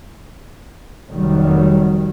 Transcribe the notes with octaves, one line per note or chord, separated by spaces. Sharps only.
F1 D#3 F#3 G3